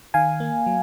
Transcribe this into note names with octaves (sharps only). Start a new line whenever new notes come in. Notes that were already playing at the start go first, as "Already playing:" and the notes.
D#3 F5 G#5
A#3
F#3